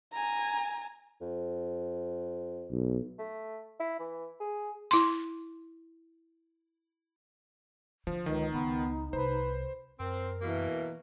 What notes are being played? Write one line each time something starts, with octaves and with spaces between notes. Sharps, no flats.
G#5 A#5
F2
B1
A3
E4
E3
G#4
E4 C6
D3 F3
C#2 D#3 D#4
C#2 B3
C2 B4 C5
F#2 C4 A#4
B2 E3 A#3